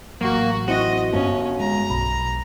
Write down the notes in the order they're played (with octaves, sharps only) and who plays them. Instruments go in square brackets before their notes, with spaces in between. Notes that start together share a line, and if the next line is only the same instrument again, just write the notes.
[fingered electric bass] A1 F#3 [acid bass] A#3 [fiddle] F#4
[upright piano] C4 E4 [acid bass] F#4 [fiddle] D#5
[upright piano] G1 [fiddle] C#4
[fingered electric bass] G#3 [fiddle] A#5
[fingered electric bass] B1 [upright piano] B5